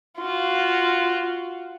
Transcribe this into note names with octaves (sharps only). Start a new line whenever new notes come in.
F4 F#4